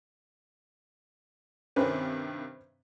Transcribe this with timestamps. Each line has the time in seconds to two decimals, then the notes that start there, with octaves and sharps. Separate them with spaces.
1.76 G2 C3 D#3 C4 C#4 B4